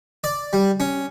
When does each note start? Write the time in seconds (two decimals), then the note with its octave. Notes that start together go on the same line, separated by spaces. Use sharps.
0.24 D5
0.53 G3
0.80 C#4